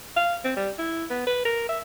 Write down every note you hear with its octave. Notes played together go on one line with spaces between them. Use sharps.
F5
C4
G3
E4
B3
B4
A#4
E5